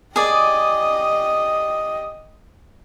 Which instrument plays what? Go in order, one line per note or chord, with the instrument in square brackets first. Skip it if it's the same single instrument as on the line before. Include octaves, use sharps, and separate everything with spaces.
[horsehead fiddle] G4 D#5 [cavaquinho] G#4 D5